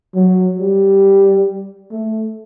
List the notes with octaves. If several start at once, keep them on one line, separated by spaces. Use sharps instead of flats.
F#3
G3
A3